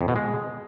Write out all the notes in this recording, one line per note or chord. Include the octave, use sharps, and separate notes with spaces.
F2
B2
G#3